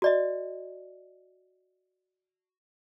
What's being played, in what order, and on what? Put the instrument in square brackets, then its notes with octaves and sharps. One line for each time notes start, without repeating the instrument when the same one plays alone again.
[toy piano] F#4 D5 D#5